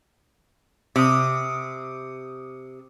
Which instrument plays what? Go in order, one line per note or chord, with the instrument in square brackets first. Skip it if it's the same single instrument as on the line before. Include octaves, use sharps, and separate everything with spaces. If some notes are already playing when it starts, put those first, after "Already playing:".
[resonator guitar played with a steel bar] C3 [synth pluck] D6 D#6